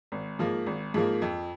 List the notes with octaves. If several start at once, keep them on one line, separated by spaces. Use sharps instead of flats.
G#1
G#2 F3 A#3
G#1
G#2 F3 A#3
F2